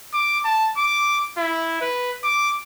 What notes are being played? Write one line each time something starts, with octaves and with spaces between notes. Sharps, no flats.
D6
A5
D6
E4
B4
D6